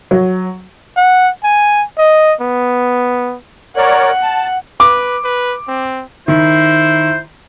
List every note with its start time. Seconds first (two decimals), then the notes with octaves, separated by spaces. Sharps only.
0.11 F#3
0.97 F#5
1.44 G#5
1.98 D#5
2.41 B3
3.77 A#4 C#5 D5 F#5
4.22 A5
4.80 B4 D6
5.24 B4
5.68 C4
6.28 D#3 E4 C5